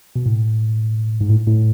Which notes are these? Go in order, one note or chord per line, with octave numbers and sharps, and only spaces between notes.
B2
A2
G#2
A2
A2